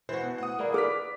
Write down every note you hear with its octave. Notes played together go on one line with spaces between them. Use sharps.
E3 F#4 C5
B2
A3 F#5 D#6
A#3 E4 G#4 D5
G#4 B4 D5 D6 F6 B6